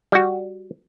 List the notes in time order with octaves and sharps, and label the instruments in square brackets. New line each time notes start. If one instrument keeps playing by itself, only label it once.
[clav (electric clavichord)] G3 F#4